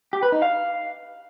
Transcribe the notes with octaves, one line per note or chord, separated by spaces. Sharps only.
G4
B4
D#4
F5